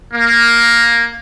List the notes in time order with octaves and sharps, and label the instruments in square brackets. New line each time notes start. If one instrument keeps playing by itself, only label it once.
[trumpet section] A#3